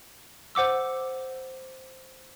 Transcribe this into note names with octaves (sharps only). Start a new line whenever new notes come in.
C5 F#5 D6 E6